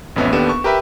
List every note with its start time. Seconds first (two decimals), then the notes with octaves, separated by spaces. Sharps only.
0.16 A1 F2 B3 C#4 E5
0.33 D#2 B3 D4 G4 A4 E7
0.49 C#6
0.64 G4 A#4 B4 E5 G5